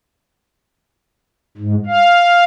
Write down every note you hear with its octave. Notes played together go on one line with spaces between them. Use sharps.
G#2
F5